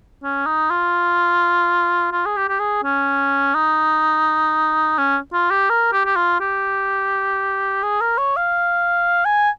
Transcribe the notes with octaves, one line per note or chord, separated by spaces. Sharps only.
C#4
D#4
F4
F4
G#4
G4
G4
G#4
C#4
D#4
C#4
F4
G4
A#4
G4
G4
F4
G4
G#4
A#4
C#5
F5
G#5